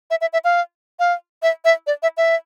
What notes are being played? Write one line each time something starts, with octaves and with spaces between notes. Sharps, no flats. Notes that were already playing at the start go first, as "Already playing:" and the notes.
E5
E5
E5
F5
F5
E5
E5
D5
E5
E5